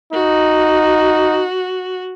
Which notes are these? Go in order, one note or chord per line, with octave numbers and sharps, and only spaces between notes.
D#4 F#4